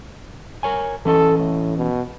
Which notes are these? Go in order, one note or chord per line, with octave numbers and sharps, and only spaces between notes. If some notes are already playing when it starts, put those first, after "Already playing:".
A#4 C#5 G#5
E3 C#4 A4 D#5
A2
B2